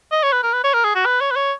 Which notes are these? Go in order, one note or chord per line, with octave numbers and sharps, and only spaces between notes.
D#5
C#5
B4
A#4
B4
C#5
A#4
G#4
F#4
B4
C#5
B4
C#5